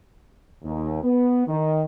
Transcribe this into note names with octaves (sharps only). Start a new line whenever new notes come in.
D#2
B3
D#3